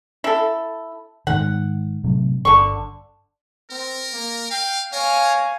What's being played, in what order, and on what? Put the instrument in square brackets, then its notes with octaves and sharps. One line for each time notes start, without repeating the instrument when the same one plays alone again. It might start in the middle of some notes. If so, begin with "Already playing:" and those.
[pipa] E4 A4
[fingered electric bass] G#2 D#3 [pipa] F#5
[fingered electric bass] A2 C3 F#3
[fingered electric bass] G1 [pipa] D3 C#6
[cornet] C4 [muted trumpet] A#4
[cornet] A#3
[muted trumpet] F5 [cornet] G5
[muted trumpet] A#4 [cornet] C#5 [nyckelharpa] F5 G#5